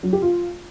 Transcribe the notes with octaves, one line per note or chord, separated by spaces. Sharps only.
F#3
G4
F4